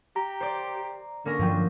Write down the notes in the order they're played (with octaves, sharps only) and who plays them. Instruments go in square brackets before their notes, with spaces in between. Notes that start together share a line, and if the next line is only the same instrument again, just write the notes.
[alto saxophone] G4 [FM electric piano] A#5
[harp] C5 D5
[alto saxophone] D3 [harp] A#3 C#4 A#4
[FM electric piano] G2 G5 [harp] F3 F#3 D4